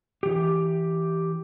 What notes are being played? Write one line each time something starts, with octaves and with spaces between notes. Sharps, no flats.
E3 G4